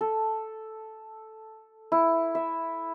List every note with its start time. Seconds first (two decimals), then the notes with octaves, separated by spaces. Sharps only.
0.01 A4
1.92 E4
2.35 E5